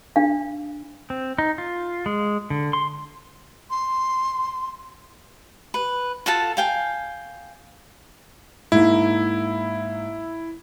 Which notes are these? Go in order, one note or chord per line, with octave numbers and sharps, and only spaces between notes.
D4 F5
C4
D#4
F4
G#3
D3
C6
C6
B4
F4 F#4 A4 A5
F5 G5 G#5
G#2 A#3 E4